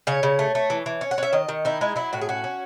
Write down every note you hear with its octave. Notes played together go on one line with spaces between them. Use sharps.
C#3 C#5
C#3
A3
A3
E3
E3
C#4
F#5
C#4 E5
D#3 D#5
D#3
D#4 E4
G#3 E4
F#3 E4
A2 F#4
G#4
C#4 F#4
C#4